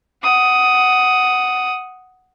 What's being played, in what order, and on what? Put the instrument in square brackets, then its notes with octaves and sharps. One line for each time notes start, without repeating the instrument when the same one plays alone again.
[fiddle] F#5 D#6